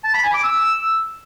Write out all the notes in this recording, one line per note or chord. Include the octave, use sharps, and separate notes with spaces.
A5
B5
G#5
D6
E6